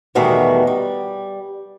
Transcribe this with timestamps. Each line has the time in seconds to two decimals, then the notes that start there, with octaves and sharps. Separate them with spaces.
0.15 E2 B2 D#3 G3 A3 F#4
0.67 G3